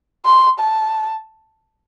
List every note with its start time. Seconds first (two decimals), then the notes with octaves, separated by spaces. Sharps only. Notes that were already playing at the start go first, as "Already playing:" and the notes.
0.25 C6
0.59 A5